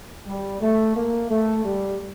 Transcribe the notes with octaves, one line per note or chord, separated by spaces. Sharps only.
G3
A3
A#3
A3
G3